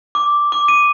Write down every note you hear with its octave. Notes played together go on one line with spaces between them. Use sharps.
D6
D6
D#7